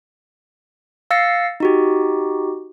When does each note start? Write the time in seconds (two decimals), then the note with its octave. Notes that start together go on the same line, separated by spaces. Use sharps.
1.11 F5 E6 A6 A#6 C7 C#7
1.60 D#4 F#4 G4